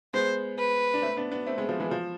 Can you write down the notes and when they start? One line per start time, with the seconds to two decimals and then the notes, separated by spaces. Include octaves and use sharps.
0.14 G#3 B3 C5
0.58 B4
0.94 D4
1.02 A3 C4
1.17 B3 D4
1.31 B3 D4
1.46 A3 C4
1.58 G#3 B3
1.69 F3 A3
1.80 E3 G#3
1.91 F3